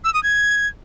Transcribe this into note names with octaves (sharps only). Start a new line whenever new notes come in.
E6
D#6
G#6